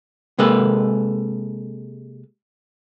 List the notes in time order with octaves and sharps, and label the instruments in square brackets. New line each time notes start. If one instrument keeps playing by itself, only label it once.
[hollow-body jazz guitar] C3 G#3 A#3 A4 B4